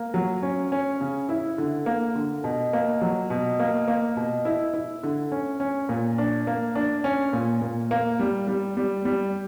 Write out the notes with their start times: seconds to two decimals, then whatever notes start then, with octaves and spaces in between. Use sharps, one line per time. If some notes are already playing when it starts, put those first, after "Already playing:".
Already playing: A#3
0.14 F#3
0.43 C#4
0.72 C#4
1.01 C#3
1.29 E4
1.58 D3
1.86 A#3
2.15 D3
2.44 B2
2.73 A#3
3.01 F#3
3.30 B2
3.59 A#3
3.87 A#3
4.17 B2
4.45 E4
4.74 E4
5.03 D3
5.32 C#4
5.60 C#4
5.89 A#2
6.18 D4
6.47 A#3
6.75 D4
7.04 C#4
7.33 A#2
7.62 A#2
7.91 A#3
8.19 G3
8.47 G3
8.77 G3
9.05 G3